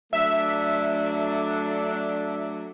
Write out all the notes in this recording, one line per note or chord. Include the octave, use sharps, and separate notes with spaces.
F#3 A3 D4 E5